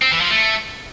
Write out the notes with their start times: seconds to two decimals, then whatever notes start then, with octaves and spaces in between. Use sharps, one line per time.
0.02 C4
0.12 E3
0.21 F3
0.31 A3